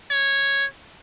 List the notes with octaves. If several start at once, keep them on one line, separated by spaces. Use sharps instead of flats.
C#5